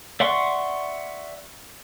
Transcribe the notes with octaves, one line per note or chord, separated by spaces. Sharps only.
D5 E5 F#5 C6 C#6